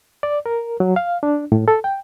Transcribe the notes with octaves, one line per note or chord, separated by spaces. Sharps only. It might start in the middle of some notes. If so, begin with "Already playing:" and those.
D5
A#4
F#3
F5
D4
A2
A4
G5